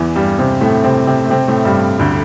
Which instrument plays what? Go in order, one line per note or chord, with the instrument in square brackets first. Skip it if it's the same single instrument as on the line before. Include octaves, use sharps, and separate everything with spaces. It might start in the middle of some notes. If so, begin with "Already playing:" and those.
Already playing: [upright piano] E2 E3
G2 G3
C3 C4
A2 A3
C3 C4
C3 C4
A3
C3 C4
A2 A3
G2 G3
D2 D3